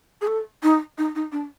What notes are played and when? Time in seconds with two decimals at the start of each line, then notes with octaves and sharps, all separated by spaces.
0.21 G#4
0.27 A4
0.63 D#4
0.98 D#4
1.15 D#4
1.32 D4